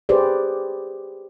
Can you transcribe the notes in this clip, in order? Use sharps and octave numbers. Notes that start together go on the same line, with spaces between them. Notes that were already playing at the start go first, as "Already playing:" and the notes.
G4 G#4 B4 C5 D5